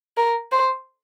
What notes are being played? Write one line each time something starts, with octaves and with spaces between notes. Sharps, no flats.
A#4
C5